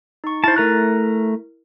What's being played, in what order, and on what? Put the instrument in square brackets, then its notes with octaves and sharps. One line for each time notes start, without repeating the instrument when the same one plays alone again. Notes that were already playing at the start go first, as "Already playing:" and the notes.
[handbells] D#4 C#6
[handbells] E4 A6 [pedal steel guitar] C5 A5
[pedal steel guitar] A3 A#5 F#6 [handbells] E4 A#4